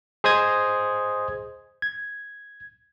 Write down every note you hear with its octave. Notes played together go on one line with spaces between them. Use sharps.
G#4 C5 D#5 D#6 G#6
G#6